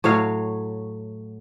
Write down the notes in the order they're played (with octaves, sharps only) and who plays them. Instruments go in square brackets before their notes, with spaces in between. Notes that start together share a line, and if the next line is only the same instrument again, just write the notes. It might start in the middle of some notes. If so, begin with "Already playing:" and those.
[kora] A2 F#3 C#5 F5